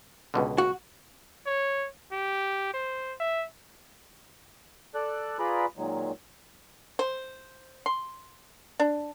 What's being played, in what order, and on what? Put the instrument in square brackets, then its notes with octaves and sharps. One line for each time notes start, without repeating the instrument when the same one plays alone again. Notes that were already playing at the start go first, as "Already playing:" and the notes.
[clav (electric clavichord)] C#2 B2 D3
[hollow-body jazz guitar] F#4
[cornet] C#5
G4
C5
E5
[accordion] A4 D5 F#6
F4 G#4 B4 D5 A#5 B5
A#2 D#3 F#3 G#3
[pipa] C5
C6
D4